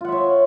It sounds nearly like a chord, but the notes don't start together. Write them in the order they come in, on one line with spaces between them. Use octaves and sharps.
F4 F#5 E5 C#5